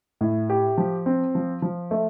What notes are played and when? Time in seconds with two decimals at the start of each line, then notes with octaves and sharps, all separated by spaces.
0.21 A2
0.50 G4
0.78 F3
1.06 C4
1.35 F3
1.62 F3
1.91 A3